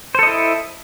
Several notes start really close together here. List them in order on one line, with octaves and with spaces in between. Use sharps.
C5 A4 D#5 E4